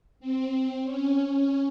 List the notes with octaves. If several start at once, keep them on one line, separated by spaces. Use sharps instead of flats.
C4
C#4
C#4